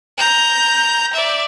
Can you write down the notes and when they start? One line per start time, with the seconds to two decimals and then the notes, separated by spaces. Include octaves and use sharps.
0.17 A#5 G6
1.14 D5 E5